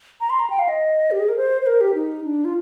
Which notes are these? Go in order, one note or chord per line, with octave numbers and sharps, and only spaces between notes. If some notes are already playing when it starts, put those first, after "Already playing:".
A#5
C6
A#5
G5
F5
D#5
G4
G#4
A#4
C5
C5
A#4
G4
D#4
D4
F4